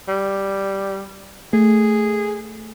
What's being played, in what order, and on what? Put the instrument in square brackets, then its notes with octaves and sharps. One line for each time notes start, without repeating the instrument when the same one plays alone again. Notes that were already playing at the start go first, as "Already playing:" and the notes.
[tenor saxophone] G3
[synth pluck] A3 [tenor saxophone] G#4